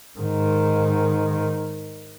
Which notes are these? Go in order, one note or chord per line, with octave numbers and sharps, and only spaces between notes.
G#2 D#3